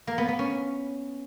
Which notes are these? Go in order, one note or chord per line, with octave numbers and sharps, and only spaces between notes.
A#3
B3
B3
C#4